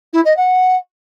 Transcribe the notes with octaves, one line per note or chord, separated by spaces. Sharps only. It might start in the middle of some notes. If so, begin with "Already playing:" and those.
E4
D#5
F#5